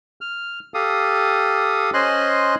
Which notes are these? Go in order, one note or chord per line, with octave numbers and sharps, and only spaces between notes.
F6
G4 A4 F5 D#6
C#4 C5 D#5 G#5 C6 F#6